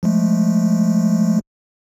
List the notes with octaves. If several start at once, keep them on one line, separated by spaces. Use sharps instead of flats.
F3 G#3 A3